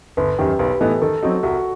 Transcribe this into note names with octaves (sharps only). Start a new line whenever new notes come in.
G1 B4
F#2 D#3 G4
B1 B4
A2 E3 B3 D#4 A4
D#3 A4
F#3 C4 D#4 F#4
C2 F#4